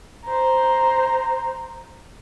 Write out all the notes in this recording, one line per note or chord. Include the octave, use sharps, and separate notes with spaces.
C5 A#5